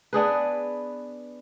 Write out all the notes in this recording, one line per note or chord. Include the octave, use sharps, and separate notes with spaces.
B3 D4 G#4 B4